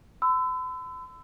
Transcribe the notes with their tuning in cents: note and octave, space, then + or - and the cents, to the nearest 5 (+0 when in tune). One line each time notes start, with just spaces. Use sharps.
B5 +45 E6 +0